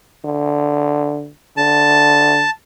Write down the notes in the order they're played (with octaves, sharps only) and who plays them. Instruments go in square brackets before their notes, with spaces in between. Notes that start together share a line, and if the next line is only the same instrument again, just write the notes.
[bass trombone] D3
[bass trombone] D3 [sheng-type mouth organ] A5